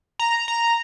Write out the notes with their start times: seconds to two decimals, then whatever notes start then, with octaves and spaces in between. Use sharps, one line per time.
0.19 A#5
0.48 A#5